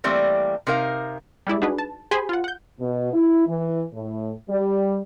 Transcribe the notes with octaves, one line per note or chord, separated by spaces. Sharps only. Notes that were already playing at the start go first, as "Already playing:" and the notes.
E3 G3 A3 A#3 C4
C3 D#4 A#4 F5
G3 G#3 E4 D5
D4 D#4 F#4 G#4 B4
A5
G4 G#4 C5 G#5 B5 C6
F4 F#5
F#5 G6
B2
E4
E3
A2
G3